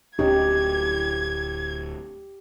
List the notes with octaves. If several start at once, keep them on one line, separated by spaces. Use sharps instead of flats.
D1 C#4 D#4 G4 G#6